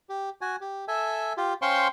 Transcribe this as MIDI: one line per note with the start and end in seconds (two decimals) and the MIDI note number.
0.09 0.29 67
0.41 0.56 66
0.41 0.56 80
0.61 0.85 67
0.88 1.33 69
0.88 1.33 76
0.88 1.33 80
1.37 1.53 65
1.37 1.53 67
1.62 1.88 61
1.62 1.88 72
1.62 1.88 77
1.62 1.88 79
1.62 1.88 84
1.62 1.88 85